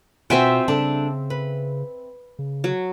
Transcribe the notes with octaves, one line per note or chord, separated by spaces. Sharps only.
B2 C4 F4 F#4 E5 G5 G#5
C#3 G3 D4 A4
B4
C#3
F#3